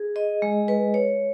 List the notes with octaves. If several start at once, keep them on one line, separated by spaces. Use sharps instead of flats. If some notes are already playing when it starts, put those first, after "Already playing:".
Already playing: G#4
D#5
G#3
B4
C#5